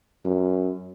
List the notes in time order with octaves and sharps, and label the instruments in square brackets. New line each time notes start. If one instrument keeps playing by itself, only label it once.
[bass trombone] F#2